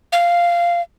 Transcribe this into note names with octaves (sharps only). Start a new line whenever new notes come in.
F5